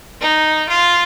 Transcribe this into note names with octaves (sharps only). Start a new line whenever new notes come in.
D#4
F4